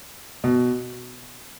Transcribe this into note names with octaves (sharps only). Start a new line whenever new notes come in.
B2